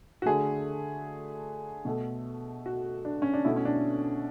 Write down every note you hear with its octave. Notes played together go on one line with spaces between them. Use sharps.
F#4
D3 A3 G#4
B2 A3
F#4
D4
C#4
D4
B2 A3 E4
C#4
D4